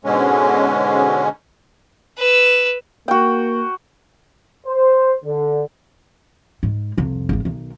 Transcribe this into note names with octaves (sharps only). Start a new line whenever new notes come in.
G#2 B2 D3 G#3 C#4
B4 E6
A#3 F#4 G5
C5
D3
G#2
C2 F2
G#1 E3
B1 D#3